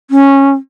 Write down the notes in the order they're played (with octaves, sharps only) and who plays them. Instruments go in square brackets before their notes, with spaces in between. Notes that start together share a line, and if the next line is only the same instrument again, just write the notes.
[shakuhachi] C#4